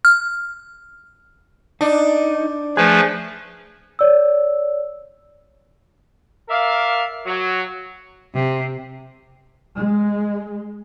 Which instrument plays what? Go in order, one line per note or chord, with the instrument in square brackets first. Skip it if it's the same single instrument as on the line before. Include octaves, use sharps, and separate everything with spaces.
[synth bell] F6
[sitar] D4 [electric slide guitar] D#4
[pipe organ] F3 A3 B4 [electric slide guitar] G#4
[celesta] C#5 D5 E6
[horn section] A#4 D5 E5 F5
F#3
[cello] C3
[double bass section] G#3